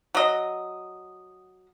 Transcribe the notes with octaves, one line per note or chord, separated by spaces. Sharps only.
F#3 D#5